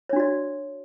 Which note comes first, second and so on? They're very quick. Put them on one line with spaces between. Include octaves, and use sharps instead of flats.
C#5 D4 F#4 D5